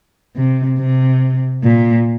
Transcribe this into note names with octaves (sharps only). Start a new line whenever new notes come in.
C3
C3
A#2